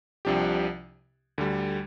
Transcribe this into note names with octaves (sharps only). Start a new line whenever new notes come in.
C2 C3 F3 D4 G4
D2 D3 G3